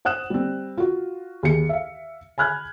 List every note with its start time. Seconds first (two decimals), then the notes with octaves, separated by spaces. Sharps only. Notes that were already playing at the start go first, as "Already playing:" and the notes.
0.05 C5 F#5 D#6 F#6 E7
0.30 G3 C4
0.78 F4 F#4
1.43 D#2 G#4 C#7
1.69 E5 F5
2.38 G#5 B5 F6 F#6 G#6